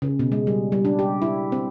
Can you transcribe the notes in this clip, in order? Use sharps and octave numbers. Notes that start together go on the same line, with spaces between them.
C#3
B2
G#3
G3
G3
D4
G4
E4
C4